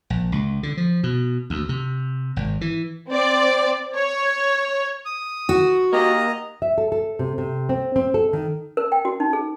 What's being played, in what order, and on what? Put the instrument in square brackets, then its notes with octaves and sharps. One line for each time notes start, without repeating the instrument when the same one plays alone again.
[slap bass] A#1
C#2
D3
F3
B2
D2
C3
G#1
E3
[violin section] C4 D5
C#5
[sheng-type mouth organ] D#6
[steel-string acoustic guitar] F#4
[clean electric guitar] A#3 G4 [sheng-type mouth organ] D#5 A#5
[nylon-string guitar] E5
A4
A4
C3
C3
C4
C4
A4
D#3
[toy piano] A#4
G5
F#4
D#4
G#4